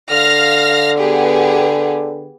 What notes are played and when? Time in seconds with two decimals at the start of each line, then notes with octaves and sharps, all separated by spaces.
0.11 D3 F5 F6 A#6
0.98 B3 G4 G#4